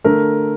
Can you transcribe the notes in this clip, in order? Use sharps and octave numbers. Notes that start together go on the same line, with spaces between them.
D3 A3 A#4